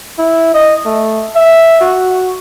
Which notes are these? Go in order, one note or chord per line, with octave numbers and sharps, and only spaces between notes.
E4
D#5
A3
E5
F#4